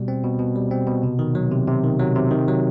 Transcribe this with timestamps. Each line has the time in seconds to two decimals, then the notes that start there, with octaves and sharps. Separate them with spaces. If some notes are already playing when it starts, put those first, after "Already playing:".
Already playing: B2 G3
0.08 C4
0.24 B2
0.39 B2
0.56 G3
0.71 C4
0.87 B2
1.03 C3
1.19 D#3
1.35 F#3
1.52 C3
1.67 C3
1.84 D#3
1.99 F#3
2.16 C3
2.31 D#3
2.48 F#3